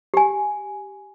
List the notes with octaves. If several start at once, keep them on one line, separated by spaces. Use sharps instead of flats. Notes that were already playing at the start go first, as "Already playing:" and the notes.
G4 G#5